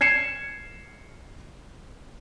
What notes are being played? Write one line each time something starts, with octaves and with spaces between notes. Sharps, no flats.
G#6 C7 C#7 E7